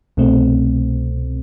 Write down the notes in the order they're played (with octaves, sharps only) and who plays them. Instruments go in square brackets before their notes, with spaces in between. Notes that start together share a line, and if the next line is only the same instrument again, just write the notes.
[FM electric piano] C2 B2 A3 C4